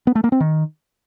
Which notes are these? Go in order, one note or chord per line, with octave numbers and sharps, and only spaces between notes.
B3
A3
A#3
C4
D#3